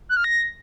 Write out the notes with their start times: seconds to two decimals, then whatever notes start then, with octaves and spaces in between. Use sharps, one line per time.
0.09 F#6
0.17 F6
0.24 A#6